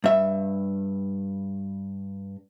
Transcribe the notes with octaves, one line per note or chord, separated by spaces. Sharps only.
G2 E5